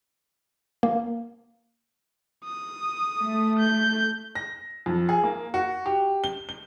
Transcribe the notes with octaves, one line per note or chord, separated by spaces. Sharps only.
A#3
D#6
A3
G6
A#6
F2
G#4
A#3
F#4
G4
G7
G7